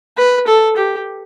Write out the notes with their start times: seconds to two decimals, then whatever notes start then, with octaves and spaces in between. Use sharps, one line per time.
0.18 B4
0.47 A4
0.77 G4